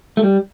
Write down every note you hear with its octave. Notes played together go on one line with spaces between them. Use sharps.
A3
G3